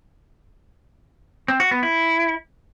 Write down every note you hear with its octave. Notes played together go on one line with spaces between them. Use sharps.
C4
F#4
B3
E4